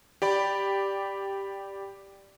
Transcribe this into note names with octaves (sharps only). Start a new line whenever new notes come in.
G4 D5 B5